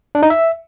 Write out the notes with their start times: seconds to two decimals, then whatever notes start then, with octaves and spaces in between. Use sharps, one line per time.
0.15 D4
0.23 D#4
0.30 E5